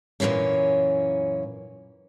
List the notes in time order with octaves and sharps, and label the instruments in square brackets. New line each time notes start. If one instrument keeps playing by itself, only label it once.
[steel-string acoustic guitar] F#2 A#2 E3 A#3 C#4